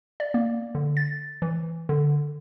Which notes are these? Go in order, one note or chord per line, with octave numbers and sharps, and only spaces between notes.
D5
A#3
D3
A6
E3
D3